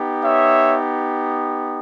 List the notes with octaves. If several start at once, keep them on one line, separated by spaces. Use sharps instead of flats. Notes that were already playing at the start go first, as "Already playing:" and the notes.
Already playing: B3 D#4 G4
C#5 E5